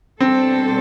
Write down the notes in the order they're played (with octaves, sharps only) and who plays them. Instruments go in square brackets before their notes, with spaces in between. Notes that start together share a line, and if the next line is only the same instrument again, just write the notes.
[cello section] B2 G3 D4 A4 C5 [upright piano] C4